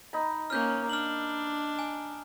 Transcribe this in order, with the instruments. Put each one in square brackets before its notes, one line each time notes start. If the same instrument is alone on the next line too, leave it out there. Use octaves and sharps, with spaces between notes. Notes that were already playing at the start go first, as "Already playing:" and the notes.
[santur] D#4 B5
[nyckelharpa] A#3 C#4 [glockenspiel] F6 G6
[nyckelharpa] D4 [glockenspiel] F6 F#7
[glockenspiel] G#5